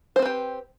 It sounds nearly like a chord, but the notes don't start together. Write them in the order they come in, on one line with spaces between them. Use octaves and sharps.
C5 C4 B4 G4